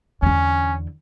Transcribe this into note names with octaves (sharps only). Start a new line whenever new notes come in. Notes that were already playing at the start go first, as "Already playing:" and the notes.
E2 D3 C#4